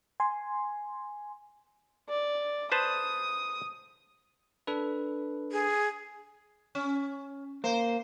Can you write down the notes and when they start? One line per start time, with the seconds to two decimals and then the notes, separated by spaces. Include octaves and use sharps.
0.20 G#5 C6
2.09 D5
2.72 B4 C5 A5 D#6
4.67 D4 A4 B4
5.52 G#4
6.75 C#4
7.64 A#3 C5